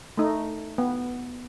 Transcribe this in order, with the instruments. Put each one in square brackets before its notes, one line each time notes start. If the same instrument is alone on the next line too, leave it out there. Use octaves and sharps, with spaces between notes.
[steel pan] A3 D#4
B3